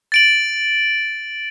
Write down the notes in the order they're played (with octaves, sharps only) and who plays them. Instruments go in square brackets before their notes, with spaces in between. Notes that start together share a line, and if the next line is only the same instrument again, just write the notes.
[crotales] A6 D7 F#7